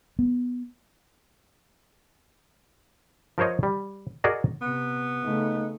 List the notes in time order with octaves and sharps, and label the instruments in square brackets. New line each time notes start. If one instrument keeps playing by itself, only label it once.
[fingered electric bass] B3
[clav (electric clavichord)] F3 A#4 C5 C#5 D#5
G3
F#4 G#4 A#4 D5 D#5
[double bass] C3 [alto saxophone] B3
[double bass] C#3 A3 [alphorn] D#4